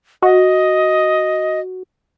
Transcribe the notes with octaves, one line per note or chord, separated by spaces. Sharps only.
F#4 D#5